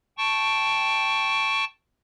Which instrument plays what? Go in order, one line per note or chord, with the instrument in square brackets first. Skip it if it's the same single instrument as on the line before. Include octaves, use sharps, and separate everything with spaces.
[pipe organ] G5 A5 C#6